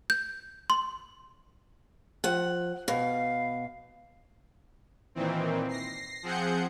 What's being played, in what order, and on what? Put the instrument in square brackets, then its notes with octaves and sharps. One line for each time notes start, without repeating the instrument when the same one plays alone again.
[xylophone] G6
C6
[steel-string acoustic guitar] F3 F#5
[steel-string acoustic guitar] B2 [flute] F5
[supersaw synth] A#2 D#3 E3 C4
A#6 C7
F3 C4 G#4 F#5 G6 C#7